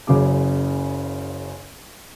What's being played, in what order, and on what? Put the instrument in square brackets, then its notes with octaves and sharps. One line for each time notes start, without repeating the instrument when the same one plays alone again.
[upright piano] F#1 C#3 F#3 G#4 D6